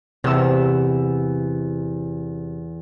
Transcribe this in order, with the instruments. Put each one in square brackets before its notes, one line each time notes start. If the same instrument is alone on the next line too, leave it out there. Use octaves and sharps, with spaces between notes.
[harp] E2 E6 [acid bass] C3